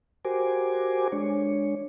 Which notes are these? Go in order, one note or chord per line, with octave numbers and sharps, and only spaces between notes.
F#4 G4 A#4 C5 G#5 D6
G#3 D4 C#5